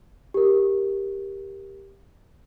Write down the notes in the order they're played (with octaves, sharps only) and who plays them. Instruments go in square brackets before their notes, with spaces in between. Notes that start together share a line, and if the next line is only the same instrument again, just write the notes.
[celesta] G4 A#4